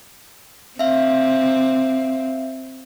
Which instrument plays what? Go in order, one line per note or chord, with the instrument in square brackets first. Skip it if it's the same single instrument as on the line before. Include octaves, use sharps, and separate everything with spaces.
[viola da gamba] C4 [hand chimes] E5 F5